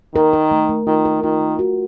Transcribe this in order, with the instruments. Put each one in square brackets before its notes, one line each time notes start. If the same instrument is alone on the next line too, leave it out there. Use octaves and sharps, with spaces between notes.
[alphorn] D#3 [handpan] A#4
[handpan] A#4
A3
A3
[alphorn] D#3 [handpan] F4
[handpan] A#4
[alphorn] D#3 [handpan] F4
[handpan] A3
F#4